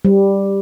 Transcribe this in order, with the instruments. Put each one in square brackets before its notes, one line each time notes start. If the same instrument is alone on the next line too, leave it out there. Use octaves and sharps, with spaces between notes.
[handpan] G3